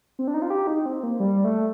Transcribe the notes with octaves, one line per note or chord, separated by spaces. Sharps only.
C4
D4
D#4
F4
G4
D#4
C4
A#3
G3
A3